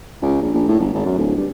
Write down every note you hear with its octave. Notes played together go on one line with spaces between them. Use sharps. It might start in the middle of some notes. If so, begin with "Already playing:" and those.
C#2
A#1
A#1
A2
G1
G#1
F#2
D1
G2